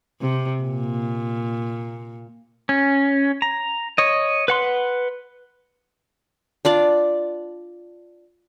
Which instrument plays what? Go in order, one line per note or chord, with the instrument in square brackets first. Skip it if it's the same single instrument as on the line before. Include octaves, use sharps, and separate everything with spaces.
[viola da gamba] C3
A#2
[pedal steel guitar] C#4
A#5
C#5 D#5
B4 F#5 C6
[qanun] D4 F4 D5